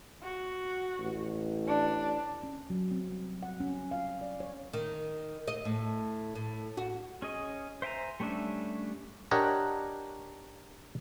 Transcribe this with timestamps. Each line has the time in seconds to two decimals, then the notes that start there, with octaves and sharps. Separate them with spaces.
0.23 F#4
0.99 A1
1.67 D4
2.43 C#4
2.70 F#3
2.91 C4
3.11 G3
3.43 F#5
3.60 C#4
3.91 F5
4.21 D5
4.40 C#5
4.73 D#3
5.48 D#5
5.65 A2
6.35 A2
6.77 F#4
7.22 C#4 G#4 D#5
7.82 C5 E5 G5 G#5 A#5
8.20 G3 A3 C#4 D4 E5
9.31 D4 G4 A#4 C#5 D#5 F#5